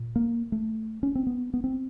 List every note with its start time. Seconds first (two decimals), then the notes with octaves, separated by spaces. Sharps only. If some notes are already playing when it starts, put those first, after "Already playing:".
Already playing: A#2
0.16 A#3
0.52 A3
1.03 C#4
1.15 C4
1.27 B3
1.54 B3
1.64 C4